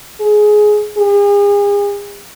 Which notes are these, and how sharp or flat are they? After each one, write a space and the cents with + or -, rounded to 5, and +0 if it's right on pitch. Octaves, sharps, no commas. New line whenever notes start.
G#4 +15
G#4 -40